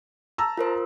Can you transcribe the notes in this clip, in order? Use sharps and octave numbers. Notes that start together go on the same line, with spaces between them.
A5 A#5 E6
F4 A#4 C5